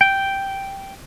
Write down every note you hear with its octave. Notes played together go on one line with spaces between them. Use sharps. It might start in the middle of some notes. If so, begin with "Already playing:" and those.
G5